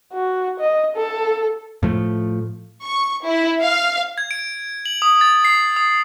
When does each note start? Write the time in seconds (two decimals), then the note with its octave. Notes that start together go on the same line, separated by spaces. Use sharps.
0.13 F#4
0.60 D#5
0.96 A4
1.83 A2 F3 A3
2.82 C#6
3.26 E4
3.62 F5
4.18 G#6
4.31 D7
4.86 F#7
5.02 D#6
5.21 A6
5.45 C7
5.77 D#6